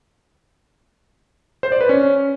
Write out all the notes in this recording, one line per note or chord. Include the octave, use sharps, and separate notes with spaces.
C5
D5
B4
C#4